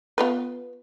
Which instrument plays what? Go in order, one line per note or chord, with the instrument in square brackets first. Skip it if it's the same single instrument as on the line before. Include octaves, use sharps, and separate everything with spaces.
[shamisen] B3 F4 B4